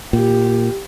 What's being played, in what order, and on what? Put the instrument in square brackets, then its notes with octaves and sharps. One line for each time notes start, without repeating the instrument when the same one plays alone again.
[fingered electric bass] A#2 [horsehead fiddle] G4